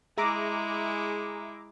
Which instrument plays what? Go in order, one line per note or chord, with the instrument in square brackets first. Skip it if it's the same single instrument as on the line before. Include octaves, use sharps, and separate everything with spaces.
[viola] G#3 E4 [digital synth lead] G#4 [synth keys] E5 A#5 D6